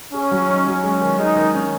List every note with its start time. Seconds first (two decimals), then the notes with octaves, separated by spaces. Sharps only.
0.13 C#4 G#4
0.31 F#3
0.49 D#4
0.66 F#3
0.84 G#3 C#4
1.01 D#3
1.18 G#3 D#4
1.37 D#3
1.55 C#4